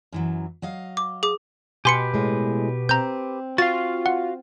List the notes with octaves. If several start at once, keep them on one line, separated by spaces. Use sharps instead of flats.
F#2 E3 F#3
F#3 D#5 F5
D6
G#4 D6
B2 G4 B4 G#5 C6 C#7
A2 G#3
C4 A#5 G6
F4 F#4 F5 A6
F#5